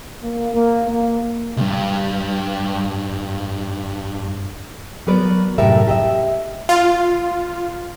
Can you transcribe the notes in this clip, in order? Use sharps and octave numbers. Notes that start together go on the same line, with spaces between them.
A#3
A#3
A#3
C2 G2
F#3 B3 A#4 B4 D5
F#2 A2 C3 G4 A#4 E5
G4 D#5 E5
F4